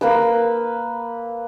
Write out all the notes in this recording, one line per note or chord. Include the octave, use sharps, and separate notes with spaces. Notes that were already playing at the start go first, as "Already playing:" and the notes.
A#3 B4 E6